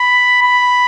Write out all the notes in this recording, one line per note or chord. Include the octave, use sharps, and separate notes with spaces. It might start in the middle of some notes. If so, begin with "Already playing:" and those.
Already playing: B5
B5